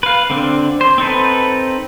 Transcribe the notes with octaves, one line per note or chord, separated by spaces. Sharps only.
B4 F5
D3 C4 D4
C5
C4 D#4 A4 B4